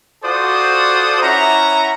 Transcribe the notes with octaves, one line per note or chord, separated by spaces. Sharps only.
F4 F#4 A4 C5 D5 D#6
C#4 E4 E5 F#5 A#5